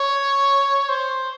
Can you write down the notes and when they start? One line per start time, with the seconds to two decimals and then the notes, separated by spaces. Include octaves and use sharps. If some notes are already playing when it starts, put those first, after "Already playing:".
Already playing: C#5
0.89 C5